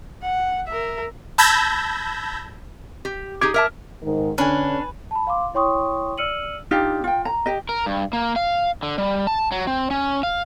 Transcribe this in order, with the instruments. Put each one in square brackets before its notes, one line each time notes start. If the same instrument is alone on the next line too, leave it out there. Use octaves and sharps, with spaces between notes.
[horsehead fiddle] F#5
A#4 E5
[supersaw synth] A5 B5 E6 G6 G#6 A#6
[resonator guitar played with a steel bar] G4
[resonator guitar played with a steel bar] D#4 G4 G#4 [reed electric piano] D6 G#6
[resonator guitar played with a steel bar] A#4 E5 A5
[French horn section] G#2 D#3
[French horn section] D3 [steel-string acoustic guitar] C#4 [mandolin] D4 [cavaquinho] B4 G#5
[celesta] A5 B5
F5 C6 D6
E4 C#5 G5 C6 C#6 D#6
D5 E6 F6 C#7 D#7 F#7
[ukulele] D4 D#4 F4 G4
F4 G5
A#5
G4 D#5
[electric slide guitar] A#4
G2
A#3
F5
D3
G3
A5
F#3
C4
C#4
F5